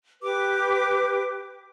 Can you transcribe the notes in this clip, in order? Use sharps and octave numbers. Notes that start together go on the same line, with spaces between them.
G4 B4 D6